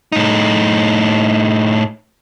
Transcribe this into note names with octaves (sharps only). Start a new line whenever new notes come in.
A2 D#4